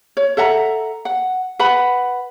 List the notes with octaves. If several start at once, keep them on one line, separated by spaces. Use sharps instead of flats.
C#5
A4 E5 F#5 A#5
F#5
B4 F#5 B5